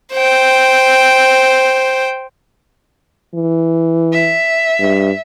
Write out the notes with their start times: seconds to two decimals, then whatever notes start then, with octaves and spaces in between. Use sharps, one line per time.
0.13 C5 G5
3.35 E3
4.13 E5
4.79 G2